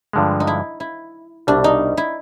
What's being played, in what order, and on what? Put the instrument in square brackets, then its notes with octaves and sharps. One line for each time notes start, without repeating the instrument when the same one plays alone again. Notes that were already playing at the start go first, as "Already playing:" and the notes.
[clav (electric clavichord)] G2 D3 F3 G#3
[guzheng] D#4
E4
E4
[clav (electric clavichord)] C2 B2 G3 [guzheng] D4
[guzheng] D#4
E4